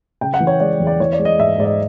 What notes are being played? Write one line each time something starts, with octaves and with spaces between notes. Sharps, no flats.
C#3 G5
F#5
E3
C#5
G#3 D5
E2
D5
E3 C#5
D5
G#3
D#5
G#2 E5
G#2 D5
D#5